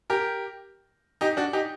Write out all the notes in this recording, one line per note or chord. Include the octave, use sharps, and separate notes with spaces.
G4 A#4
D#4 G4
D4 F#4
D#4 G4